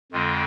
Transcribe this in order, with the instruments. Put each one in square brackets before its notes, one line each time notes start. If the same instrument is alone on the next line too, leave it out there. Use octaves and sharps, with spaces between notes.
[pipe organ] F2 D3 G#3 C4 F4